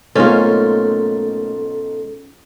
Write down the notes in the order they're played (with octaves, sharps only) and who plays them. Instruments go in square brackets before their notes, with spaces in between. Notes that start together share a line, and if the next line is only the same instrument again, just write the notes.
[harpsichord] B1 G#2 [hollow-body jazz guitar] A3 A#3 [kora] C#4 F4 [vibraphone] A4